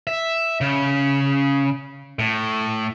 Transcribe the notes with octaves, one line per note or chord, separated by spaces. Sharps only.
E5
C#3
A2